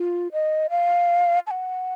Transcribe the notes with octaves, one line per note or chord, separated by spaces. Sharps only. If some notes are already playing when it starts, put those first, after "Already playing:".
Already playing: F4
D#5
F5
A5
F#5